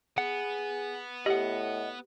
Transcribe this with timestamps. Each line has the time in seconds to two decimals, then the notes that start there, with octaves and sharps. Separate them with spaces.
0.18 B3 G#4 F#5
1.26 A2 G4 D#5 F#5